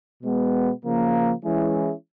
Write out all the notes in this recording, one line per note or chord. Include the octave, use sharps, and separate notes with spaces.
B2 G#3 B3
C#3 F3 A#3
E3 G#3 C#4 E4 G#4